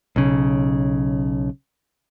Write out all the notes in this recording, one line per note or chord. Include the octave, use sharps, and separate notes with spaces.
B1 C#3